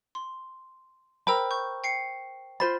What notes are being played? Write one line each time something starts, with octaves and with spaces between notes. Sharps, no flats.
C6
A#4 C5 G5 A#5 B5 E6
C#6 G6
G5 C7 C#7
F4 C5 B5 A6